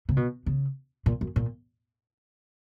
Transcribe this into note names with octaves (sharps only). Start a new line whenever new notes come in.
C#3
B2
C#3
A#2
F#2
A#2